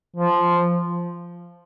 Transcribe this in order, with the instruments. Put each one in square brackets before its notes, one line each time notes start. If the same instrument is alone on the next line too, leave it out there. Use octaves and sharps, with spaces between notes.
[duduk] F3